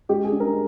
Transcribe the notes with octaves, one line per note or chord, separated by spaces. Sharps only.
G#3 G4
G#4
D4
A#4